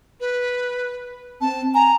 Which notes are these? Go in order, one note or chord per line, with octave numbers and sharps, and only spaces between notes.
B4
C4 A5
G#5 A#5